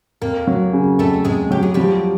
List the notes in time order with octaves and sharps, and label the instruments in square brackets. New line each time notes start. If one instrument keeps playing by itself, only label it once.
[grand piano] F2 [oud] A#3 A#4
[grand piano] F#3
C#3
[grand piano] F2 [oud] A3 A4
[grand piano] F2 [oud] G#3 G#4
[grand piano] F#3 [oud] G4
[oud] G#4
[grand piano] F3 [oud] G3 G4